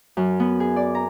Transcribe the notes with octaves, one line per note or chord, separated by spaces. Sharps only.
F#2
B3
G#4
D5
A#5